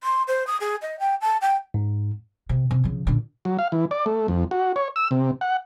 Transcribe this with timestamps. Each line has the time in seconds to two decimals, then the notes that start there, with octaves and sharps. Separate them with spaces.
0.03 C6
0.28 C5
0.47 D#6
0.60 G#4
0.82 D#5
0.99 G5
1.21 A5
1.41 G5
1.74 G#2
2.49 C3
2.71 C3
2.84 C#3 F3
3.07 A#2 D3
3.45 F#3
3.59 F5
3.72 E3
3.91 D5
4.06 A3
4.28 F2
4.51 F#4
4.76 C#5
4.96 E6
5.11 C3
5.41 F#5